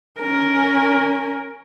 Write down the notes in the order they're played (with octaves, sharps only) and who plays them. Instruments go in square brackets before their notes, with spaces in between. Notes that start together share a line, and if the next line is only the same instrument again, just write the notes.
[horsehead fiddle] C#4 A#4